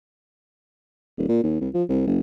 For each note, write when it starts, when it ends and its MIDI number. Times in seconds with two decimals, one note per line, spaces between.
1.17 1.26 27
1.29 1.41 46
1.44 1.59 39
1.61 1.69 36
1.74 1.83 53
1.89 2.06 36
2.07 2.20 30